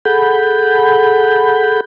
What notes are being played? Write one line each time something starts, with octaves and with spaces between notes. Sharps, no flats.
G#4 A4 F#5 B5 G6